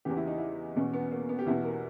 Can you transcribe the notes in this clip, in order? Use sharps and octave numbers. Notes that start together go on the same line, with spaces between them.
E2 C#3 E3 G4
E4
D#4
E4
E2 B2 C#4
B3
A#3
B3
G4
E2 B2 E4
A#4